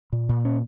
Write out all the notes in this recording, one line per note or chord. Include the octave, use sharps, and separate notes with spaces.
A#2
A#2
C#4